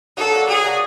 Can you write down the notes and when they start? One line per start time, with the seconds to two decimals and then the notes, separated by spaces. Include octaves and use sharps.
0.17 F#3 A4
0.33 A#3 D4 F#4
0.48 F#3 G#4
0.64 A#3 D4 F#4